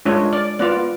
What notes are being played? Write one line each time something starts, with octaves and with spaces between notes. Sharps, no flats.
G#3 D4 F4 C#5
D5
B3 F4 D5